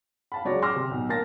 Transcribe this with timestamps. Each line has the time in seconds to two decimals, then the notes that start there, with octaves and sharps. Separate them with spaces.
0.32 F5 A5 B5
0.45 C#2 F#3 C#5 D5 F#5 A#6
0.62 C6 D6 E6 F6 A#6
0.76 C3
0.91 B1
1.09 A#3 F5 A5 A6 A#6